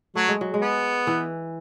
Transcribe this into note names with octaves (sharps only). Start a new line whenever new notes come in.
F#3 A3
G#3
F#3
G#3
B3
E3